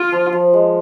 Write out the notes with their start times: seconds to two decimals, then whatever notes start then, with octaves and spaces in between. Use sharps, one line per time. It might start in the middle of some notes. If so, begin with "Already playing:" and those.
Already playing: F4
0.12 F3
0.33 F3
0.53 G#3